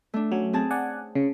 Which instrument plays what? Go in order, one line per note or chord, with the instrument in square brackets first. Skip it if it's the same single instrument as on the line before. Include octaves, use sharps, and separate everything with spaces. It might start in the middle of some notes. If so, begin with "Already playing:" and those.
[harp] A3 D4
[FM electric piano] F#3 [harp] C#4
[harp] C4 G#4 A5
[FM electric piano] D5 F#5 G#5
C#3